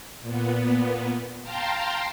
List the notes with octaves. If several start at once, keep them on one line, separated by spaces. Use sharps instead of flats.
A#2 B3
F5 G5 A5 A#5 C6